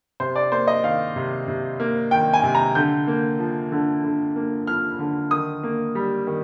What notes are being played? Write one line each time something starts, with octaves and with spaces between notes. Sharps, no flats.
C3 C5
D5
A#3 C5
D#5
D#3 F5
C3
C3
A#3
D#3 G5
G#5
C3
A#5
D3 G6
A#3
F3
D3
D3
A#3
F3 F6
D3
D#3 D#6
A#3
G3
D#3